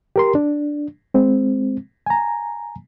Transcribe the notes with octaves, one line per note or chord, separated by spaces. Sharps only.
G4 A#4 C6
D4
G#3 C4
G#5 A#5